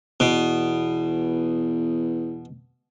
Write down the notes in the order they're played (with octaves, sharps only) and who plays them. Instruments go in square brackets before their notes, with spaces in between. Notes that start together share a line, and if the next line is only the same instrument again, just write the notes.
[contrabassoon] E2 [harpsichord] B2